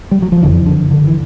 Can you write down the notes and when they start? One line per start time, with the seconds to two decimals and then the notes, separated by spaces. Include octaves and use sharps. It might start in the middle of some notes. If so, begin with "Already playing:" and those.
0.11 G3
0.22 F#3
0.32 F3
0.42 F#1 F2 D3 E3
0.66 D3
0.91 D3
1.07 E3